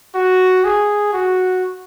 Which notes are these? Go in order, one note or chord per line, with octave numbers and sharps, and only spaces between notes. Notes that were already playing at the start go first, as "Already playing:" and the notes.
F#4
G#4
F#4